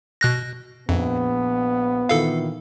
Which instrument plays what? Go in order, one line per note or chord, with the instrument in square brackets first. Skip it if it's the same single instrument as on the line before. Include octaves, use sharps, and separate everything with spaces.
[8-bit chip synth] B2 F#6 A#6
[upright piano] A#1 [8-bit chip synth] F2 [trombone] B3
[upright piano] A#2 D#3 E3 [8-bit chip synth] A4 F5